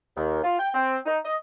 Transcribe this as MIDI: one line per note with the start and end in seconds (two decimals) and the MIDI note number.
0.17 0.40 39
0.43 0.59 65
0.59 0.69 79
0.74 0.98 60
1.06 1.18 63
1.25 1.35 75